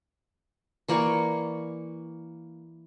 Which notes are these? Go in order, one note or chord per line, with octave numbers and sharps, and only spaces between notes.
E3 A#3 D5 C#6